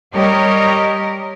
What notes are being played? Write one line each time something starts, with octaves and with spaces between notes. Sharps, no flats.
G3 G4 A#4 C#5 D#5